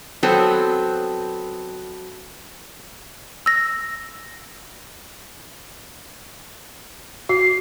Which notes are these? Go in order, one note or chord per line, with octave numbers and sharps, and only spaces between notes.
F#3 B3 C4 A4
E6 A#6
F#4 C7